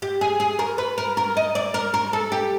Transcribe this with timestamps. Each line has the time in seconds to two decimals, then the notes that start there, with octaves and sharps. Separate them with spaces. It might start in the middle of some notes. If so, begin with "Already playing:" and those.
0.02 G4
0.21 G#4
0.40 G#4
0.59 A#4
0.78 B4
0.98 A#4
1.17 A#4
1.37 D#5
1.55 D5
1.74 A#4
1.94 A#4
2.13 A4
2.32 G4